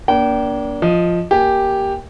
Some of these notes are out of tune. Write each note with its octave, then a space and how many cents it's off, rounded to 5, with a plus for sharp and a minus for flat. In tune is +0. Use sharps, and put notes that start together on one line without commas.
A#3 +30 D4 -25 G5 -30
F3 +0 D#5 +0
A#3 +0 G4 +0 G#5 +0